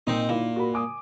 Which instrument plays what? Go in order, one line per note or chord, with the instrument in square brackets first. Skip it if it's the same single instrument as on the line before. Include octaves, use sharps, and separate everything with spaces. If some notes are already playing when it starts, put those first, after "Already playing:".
[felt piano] A#2 [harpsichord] C4 D#4
[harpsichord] A#2 [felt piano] D#4 E4
[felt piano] F#4 A#4 B5
G#5 D6 D#6